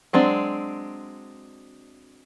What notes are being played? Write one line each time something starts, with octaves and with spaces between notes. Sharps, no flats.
F#3 G#3 C4 D4